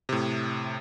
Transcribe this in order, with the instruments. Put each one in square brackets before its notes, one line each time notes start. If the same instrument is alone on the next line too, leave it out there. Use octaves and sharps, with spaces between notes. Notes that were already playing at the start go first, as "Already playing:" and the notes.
[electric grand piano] A2 C3